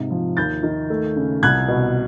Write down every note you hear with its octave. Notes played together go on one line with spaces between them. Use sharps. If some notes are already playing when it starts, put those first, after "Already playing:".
Already playing: G#2 C3
F3
D#2 G6 A6
D#3
A3
C#3
C2 F#6 G#6
B2